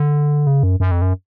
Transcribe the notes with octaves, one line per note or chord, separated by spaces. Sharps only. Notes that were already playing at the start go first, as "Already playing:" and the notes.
Already playing: D3
C#3
F#2
F#2
F2
F#2